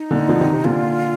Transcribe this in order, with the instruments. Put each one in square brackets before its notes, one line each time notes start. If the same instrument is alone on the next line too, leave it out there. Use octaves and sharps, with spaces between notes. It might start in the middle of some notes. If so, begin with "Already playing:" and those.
Already playing: [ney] D#4
[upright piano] A#2 D3
D3 F3
C3 D#3
C3
[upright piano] A#2 D3 [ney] F4